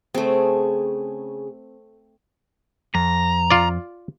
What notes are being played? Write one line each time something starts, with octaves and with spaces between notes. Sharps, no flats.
C#3 A3 C4 G#4
F2 A#5
F4 D5